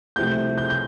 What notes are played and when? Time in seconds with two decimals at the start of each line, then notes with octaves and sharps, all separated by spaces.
0.16 C2 C3 F3 A3 G6
0.58 G6
0.70 G6